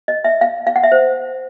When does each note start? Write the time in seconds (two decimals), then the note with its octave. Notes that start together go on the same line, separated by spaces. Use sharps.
0.08 D#5
0.24 E5
0.41 F5
0.67 F5
0.76 F#5
0.83 E5
0.92 C5